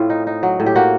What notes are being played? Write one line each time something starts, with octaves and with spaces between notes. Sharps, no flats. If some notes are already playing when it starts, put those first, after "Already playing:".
Already playing: A2 C4 F4
D#4
D#4
F#3
A2
G4
A#3 F#4